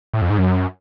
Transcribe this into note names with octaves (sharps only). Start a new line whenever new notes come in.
A2
F2
G#2
F#2